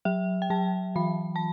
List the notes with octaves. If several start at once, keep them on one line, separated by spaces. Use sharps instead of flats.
F#3 E5
G5
F#3 A5
E3 B5
A5